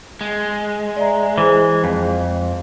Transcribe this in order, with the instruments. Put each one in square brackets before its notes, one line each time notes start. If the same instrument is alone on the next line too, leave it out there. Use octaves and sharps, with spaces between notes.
[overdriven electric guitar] G#3
[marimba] D5 E5 A#5
[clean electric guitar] E3 [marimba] G#4 C5
[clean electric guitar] F2